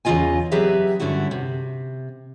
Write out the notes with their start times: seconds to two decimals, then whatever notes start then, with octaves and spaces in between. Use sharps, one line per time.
0.05 E2 C#3 D4 F4 D#5 G#5
0.51 F#3 C4 G4 G#4 B4 E5
1.00 G2 D3 C#4 D4 E4 F#4
1.31 C3